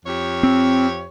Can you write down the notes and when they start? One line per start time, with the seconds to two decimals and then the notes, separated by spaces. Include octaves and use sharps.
0.06 F2 G4 C#5
0.43 C4